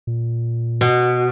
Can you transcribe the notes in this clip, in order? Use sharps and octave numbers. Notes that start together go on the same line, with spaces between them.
A#2
B2